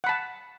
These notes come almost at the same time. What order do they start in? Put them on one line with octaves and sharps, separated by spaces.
F#5 B5 A5